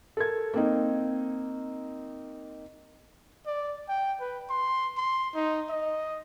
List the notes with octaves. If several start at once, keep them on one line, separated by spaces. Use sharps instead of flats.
A4 A#4 G#6
A#3 C4 D#4
D5
G5
B4
C6
C6
D#4
D#5